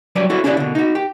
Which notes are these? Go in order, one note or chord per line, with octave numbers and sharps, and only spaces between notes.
F#3 G3 B4 D5
E4 F#4 A4 C#5
C#4 D4 E4 G4 A#4 D5
B2 D3
D#4 F#4
G4